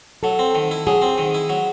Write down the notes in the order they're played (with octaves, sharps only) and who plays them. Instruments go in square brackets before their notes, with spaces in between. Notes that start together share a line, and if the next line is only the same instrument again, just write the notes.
[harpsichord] F#3 [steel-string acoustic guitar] A4
[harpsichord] C4
D#3
E4
[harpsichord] F#3 [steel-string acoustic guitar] G#4
[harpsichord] C4
D#3
E4
F#3